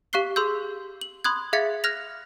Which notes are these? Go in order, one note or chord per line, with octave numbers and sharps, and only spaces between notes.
G4 F5 C#6 F#6 C7 G7
G#4 C6 E6 G6
F#7
B5 C6 D#6 F#6 G#6
G#4 E5 F5 G#6 A6 C#7
F6 F#6 G#6 A#6 F7